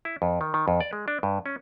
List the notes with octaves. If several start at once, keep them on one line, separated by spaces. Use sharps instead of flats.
E4
F2
D#3
D#3
F2
D5
G#3
D4
G2
C#4